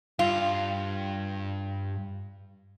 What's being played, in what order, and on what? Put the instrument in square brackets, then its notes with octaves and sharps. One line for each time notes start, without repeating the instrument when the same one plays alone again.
[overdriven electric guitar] G2 [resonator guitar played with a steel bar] F4